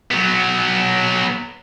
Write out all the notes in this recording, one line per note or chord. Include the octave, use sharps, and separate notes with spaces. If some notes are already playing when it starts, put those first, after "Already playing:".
F#3 B3